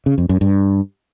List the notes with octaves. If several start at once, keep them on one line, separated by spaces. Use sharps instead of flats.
C#3
F2
F#2
G2